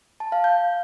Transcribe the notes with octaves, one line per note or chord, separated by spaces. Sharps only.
A5
F5
G6